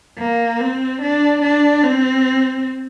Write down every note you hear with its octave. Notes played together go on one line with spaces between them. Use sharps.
A#3
C4
D4
D4
C4